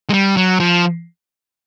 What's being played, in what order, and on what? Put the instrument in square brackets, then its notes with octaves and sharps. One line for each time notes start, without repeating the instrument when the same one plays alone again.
[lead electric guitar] G#3
G3
F#3
F3